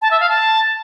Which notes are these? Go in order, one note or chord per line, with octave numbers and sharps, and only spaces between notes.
A5
E5
F5
A5